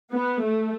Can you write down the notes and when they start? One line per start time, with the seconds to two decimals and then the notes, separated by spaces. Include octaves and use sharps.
0.13 B3
0.42 A3